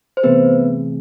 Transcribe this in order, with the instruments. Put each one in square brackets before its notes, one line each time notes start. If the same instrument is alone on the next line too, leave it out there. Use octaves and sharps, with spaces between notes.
[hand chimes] C5
[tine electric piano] C3 E3 A3 C4 G#4 [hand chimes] B3 B4